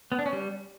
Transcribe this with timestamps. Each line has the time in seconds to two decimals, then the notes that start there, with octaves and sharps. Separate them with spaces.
0.12 B3
0.19 D4
0.26 C#4
0.33 G3